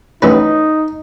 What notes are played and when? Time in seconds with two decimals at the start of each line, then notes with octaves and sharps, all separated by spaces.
0.22 A1 C#4 D#4 B4